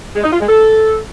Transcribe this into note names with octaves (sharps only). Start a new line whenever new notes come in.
G#3
D#4
F4
G#3
A4